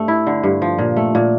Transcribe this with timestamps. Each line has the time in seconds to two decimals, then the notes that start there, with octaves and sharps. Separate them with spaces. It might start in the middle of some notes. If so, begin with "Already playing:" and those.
Already playing: G2 A3
0.08 E4
0.27 D3
0.43 G2
0.62 F3
0.78 A#2
0.97 A3
1.15 A#2